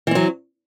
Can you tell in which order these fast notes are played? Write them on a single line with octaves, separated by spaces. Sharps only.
E3 C4 F#3